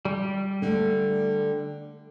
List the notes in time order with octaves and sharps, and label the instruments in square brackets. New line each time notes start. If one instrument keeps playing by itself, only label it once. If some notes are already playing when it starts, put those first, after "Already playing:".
[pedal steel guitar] G3
[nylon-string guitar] D3 A3